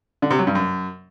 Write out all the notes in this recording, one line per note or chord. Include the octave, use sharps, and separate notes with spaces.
D3
C3
F#3
G2
F#2